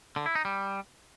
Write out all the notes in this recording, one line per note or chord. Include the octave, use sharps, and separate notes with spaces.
D3
E4
D#4
G3